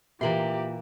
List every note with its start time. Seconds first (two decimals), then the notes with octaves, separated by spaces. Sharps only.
0.21 A#2 E3 A#3 G4 E5 C6 F#7